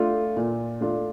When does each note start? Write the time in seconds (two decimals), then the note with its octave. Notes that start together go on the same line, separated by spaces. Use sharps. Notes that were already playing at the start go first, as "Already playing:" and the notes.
Already playing: A3 D4 F4
0.36 A#2
0.81 A3 D4 F4